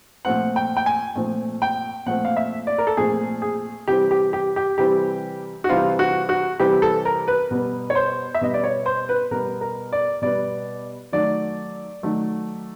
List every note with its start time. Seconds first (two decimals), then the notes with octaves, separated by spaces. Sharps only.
0.25 A#2 F3 A3 C4 F#5
0.56 G5
0.77 G5
0.86 G#5
1.15 A#2 F3 A3 C4
1.62 G5
2.06 A#2 F3 A3 C4 F#5
2.25 F5
2.37 E5
2.67 D5
2.78 A#4
2.87 A4
2.97 A#2 F3 A3 C4 G#4
3.42 G#4
3.88 C3 E3 G3 C4 G4
4.11 G4
4.33 G4
4.56 G4
4.78 C3 E3 G3 C4 G4
5.64 F#4
5.69 C3 E3 G3 C4 F4
5.99 F#4
6.29 F#4
6.60 C3 E3 G3 C4 G4
6.82 A4
7.05 A#4
7.28 B4
7.51 B2 G3 B3
7.90 C#5
7.95 C5
8.35 E5
8.41 B2 G3 B3 D#5
8.54 D5
8.64 C#5
8.86 C5
9.09 B4
9.31 B2 G3 B3 A#4
9.61 A#4
9.93 D5
10.22 B2 G3 B3 D5
11.12 D#3 F#3 A3 D5
12.03 D#3 F#3 A3